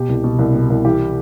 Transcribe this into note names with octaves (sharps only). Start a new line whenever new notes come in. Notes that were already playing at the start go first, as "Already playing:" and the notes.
Already playing: B2 G4
C2
B2
C2
B2
C2
E3 G4